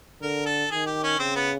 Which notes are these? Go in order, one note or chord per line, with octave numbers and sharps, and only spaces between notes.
D3 A#4
A4
D#3 G#4
G4
C#4
C#3 C4
B3